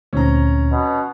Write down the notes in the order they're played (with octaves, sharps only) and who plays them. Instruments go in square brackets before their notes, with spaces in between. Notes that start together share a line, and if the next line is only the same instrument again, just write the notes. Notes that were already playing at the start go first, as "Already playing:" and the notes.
[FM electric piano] D2 A#2 C4 [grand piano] C#4 A#5
[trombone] B2